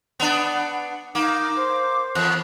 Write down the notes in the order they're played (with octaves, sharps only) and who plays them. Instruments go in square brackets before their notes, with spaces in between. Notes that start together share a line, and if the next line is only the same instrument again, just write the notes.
[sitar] B3 D4 [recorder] F#5
[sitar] A#3 [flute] D#4 [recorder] D6
[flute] C5
[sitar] E2 [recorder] F#6